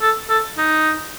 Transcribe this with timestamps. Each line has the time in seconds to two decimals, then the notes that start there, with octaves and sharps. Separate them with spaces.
0.02 A4
0.30 A4
0.58 D#4